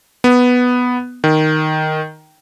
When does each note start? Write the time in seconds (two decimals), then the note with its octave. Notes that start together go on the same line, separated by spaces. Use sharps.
0.24 B3
1.24 D#3